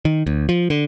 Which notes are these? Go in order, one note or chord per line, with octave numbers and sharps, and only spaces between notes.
D#3
D2
F3
D3